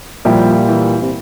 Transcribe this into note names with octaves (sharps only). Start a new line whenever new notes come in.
A#2 F3 G3 A#3 E4 G4
E3
C3